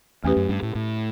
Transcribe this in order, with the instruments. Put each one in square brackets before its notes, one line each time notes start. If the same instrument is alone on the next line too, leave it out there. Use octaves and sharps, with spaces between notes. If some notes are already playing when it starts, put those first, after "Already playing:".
[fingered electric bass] E2 [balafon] A3 C#4 G4 B4
[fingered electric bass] F#2
G2
A2
A2